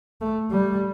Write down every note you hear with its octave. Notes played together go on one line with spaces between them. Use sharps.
A3
G3